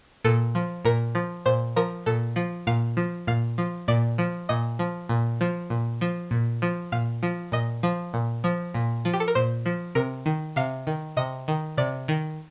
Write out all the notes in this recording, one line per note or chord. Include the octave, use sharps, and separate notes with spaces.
A#2 A4
F3
A#2 A#4
F3
A#2 C5
F3 A#4
A#2 A4
F3
A#2 F5
F3
A#2 F5
F3
A#2 D5
F3
A#2 D#5
F3
A#2
F3
A#2
F3
A#2
F3
A#2 F5
F3
A#2 D#5
F3
A#2
F3
A#2
F3
G4
A4
A#4
A#2 C5
F3
C3 A#4
D#3
C3 F5
D#3
C3 D#5
D#3
C3 D5
D#3